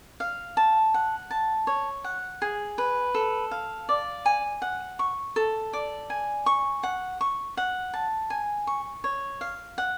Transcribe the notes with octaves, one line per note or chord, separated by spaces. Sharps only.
F5
A5
F#5
A5
C#5
F#5
G#4
B4
A4
F5
D5
G#5
F#5
C#6
A4
D5
G#5
C#6
F#5
C#6
F#5
A5
G#5
C#6
C#5
F5
F#5